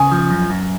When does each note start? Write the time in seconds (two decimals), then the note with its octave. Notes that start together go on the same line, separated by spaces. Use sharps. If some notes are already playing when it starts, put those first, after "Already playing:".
Already playing: C#3 G#5
0.12 F3
0.31 F#2
0.50 F#2